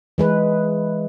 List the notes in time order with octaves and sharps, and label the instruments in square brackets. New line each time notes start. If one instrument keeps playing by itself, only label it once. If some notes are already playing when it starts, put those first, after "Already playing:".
[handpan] E3 G#3 B4